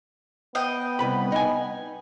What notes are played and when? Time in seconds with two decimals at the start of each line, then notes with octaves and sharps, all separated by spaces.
0.55 B3 D#5 G5
0.99 C2 B4 B5
1.32 D#4 G#5